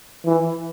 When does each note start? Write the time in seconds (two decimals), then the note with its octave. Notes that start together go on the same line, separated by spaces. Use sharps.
0.25 E3